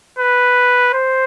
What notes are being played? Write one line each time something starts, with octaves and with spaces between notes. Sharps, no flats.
B4
C5